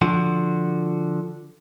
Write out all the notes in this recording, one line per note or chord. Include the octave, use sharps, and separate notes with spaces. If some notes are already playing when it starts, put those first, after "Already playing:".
D3 F3 F#4